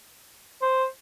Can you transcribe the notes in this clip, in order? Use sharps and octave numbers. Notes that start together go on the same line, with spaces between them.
C5